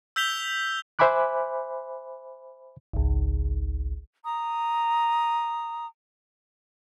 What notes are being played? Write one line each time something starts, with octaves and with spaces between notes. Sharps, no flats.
E6 G6 B6 F7 G7
C5 E5 G#5 B5 D6 F#6
G#1 C#2
A#5 D#6